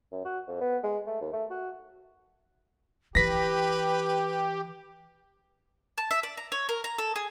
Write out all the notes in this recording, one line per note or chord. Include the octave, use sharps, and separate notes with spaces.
F#2
F#4
F2
B3
G#3
A3
D#2
A3
F#4
E3 G4 B4 A#6 B6
A5
E5
D5
A#5
C#5
A#4
A#5
A4
G#4